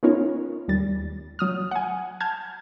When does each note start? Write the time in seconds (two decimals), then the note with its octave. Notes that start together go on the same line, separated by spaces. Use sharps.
0.03 B3 C#4 D#4 F4 A#4 C#5
0.68 D#2 G3 A6
1.39 F#3 D#6 F6
1.71 F#5 G#5
2.20 A5 F6 G6 G#6